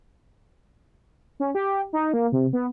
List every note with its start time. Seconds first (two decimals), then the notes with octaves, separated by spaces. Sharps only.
1.40 C#4
1.55 G4
1.93 D#4
2.14 A#3
2.32 C3
2.53 B3